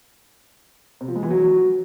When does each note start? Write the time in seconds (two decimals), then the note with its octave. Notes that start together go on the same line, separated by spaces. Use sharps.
1.01 C3
1.08 F3
1.15 G#3
1.23 E3
1.30 F#3